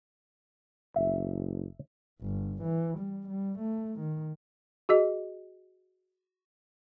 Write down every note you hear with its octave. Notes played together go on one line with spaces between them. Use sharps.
F#1 E5
G1
E3
G3
G3
A3
D#3
F#4 G#4 D#5